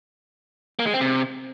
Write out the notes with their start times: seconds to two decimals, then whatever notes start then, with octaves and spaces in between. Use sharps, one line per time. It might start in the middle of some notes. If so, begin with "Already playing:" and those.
0.79 A#3
0.86 G#3
0.94 C4
1.01 C3